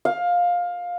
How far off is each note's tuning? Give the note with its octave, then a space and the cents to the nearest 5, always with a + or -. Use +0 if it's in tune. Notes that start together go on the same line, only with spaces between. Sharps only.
F5 +15